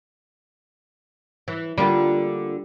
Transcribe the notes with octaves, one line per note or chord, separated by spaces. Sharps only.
E3
D3 G3 A#3 F4